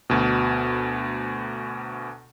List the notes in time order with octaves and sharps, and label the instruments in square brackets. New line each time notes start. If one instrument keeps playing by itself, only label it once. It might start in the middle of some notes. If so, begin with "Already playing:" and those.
[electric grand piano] D2 B2